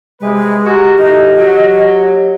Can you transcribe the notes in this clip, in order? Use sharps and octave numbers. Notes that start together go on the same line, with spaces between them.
C3 G#3 B4
F#4 G4 A#4
A2 D#4 D#5
F#3